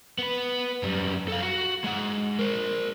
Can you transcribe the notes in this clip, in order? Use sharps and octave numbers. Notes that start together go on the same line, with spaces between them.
B3 B4
F#2 G3
A4 F5
F#4
G#3 F#5
A#4 C5